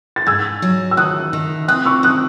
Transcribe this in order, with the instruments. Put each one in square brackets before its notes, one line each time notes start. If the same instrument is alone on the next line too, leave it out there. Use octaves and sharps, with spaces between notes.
[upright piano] A6
[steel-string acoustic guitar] G#2 [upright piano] E6 G#6
[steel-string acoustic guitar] F#3
[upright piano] E6
[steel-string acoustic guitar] D#3 [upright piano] D#6 F#6
[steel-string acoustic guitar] D#3
[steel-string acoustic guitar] C4 [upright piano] D#6 F#6
[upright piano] C#6 E6
[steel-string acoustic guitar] D#3 [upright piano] D#6 F#6